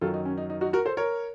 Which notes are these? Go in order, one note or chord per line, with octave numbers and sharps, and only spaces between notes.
F#2 D#3 F#3 F4 A4
D#4
C#4
D#4
D#4
D#4 F#4
F#4 A#4
A4 C5
A#4 C#5